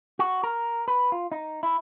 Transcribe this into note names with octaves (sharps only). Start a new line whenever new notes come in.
F#4
A#4
B4
F4
D#4
E4